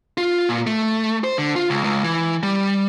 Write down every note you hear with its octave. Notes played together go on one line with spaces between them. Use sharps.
F4
A#2
A3
C5
D3
F4
C#2
C#2
E3
G3